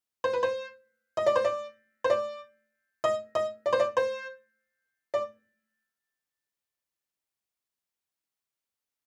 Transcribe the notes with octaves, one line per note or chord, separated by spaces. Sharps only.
C5
B4
C5
D#5
D5
C5
D5
C5
D5
D#5
D#5
D5
C5
D5
C5
D5